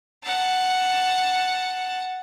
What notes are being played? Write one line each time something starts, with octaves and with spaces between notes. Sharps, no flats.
F#5 A5